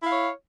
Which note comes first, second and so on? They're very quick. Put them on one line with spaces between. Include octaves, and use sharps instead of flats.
E4 F5 C#5